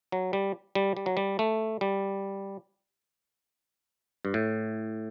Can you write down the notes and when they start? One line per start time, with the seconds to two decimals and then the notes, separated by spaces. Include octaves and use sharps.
0.12 F#3
0.33 G3
0.75 G3
0.97 G3
1.06 F#3
1.17 G3
1.39 A3
1.81 G3
4.25 G2
4.34 A2